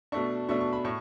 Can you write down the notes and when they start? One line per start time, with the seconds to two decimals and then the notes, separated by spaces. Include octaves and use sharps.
0.12 B2 A3 D4 C#6
0.49 B2 A3 D4 C#6
0.61 C#6
0.73 B5
0.85 A2 C#6